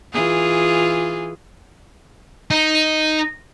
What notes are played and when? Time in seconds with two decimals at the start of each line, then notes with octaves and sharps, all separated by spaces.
0.13 E3 F4 G#4
2.51 D#4